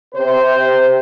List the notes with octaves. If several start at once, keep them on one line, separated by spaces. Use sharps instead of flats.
C3 C5